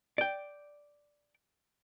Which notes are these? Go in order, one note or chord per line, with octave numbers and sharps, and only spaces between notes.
D5 G5